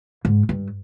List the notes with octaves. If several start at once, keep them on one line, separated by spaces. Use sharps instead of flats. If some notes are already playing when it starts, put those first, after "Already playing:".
G#2
G2